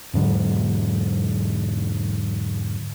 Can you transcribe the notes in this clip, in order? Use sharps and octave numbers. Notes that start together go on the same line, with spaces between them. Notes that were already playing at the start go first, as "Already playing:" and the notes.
E2 G#2 D3 F#3